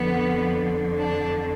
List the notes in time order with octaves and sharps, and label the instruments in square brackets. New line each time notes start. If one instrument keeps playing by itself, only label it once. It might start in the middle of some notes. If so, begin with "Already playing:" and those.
Already playing: [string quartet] F2 D3 F3 B3
D4